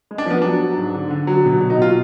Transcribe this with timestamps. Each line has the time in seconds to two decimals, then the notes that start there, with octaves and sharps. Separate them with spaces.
0.11 G#3
0.18 D4
0.26 F3 B3
0.42 F#3 D4
0.60 F#3
0.77 G#2
0.95 D3
1.10 D3
1.27 F#3
1.45 B2
1.61 F#3
1.70 D#4
1.78 B2 F4